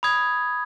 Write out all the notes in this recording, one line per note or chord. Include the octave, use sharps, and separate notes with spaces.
B5 D#6 G#6